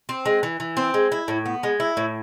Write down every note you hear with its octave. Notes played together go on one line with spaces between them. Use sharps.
C4
G#3
E3
E3
C4
G#3
E4
A2
B3
G#3
E4
A2